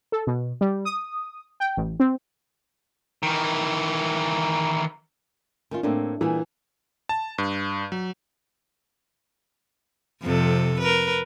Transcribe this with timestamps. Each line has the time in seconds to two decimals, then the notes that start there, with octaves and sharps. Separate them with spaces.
0.12 A4
0.27 B2
0.61 G3
0.85 D#6
1.60 G5
1.77 A1
2.00 C4
3.23 D#3 E3
5.71 D#3 C#4 F4
5.83 A2 A#3 C4 D4
6.21 A#2 E3 G3 G#4
7.09 A5
7.38 G2
7.92 F#3
10.22 F2 C3 A4
10.80 A#4 B4